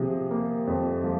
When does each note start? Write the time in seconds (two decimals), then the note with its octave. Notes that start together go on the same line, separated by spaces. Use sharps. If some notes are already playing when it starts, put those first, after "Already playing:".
Already playing: C3 F3 G#4
0.31 A#3
0.67 F2
1.04 F3